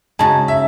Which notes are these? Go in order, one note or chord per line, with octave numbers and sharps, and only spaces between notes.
C#3 G#3 D#4 F#4 A5
E5